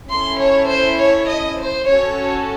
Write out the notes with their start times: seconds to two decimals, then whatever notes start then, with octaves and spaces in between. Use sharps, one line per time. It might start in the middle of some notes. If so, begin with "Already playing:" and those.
0.12 C#4 E4 A4 C6
0.41 C#5
0.70 C5
1.00 C#5
1.29 D#5
1.59 C5
1.88 C#4 F#4 A4 C#5